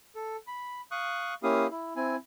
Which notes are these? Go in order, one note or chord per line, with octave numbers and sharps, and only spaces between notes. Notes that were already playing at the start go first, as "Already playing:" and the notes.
A4
B5
F5 C#6 D#6 F#6
A#3 C#4 E4 G4 F5 D#6
E4
C4 E4 G#5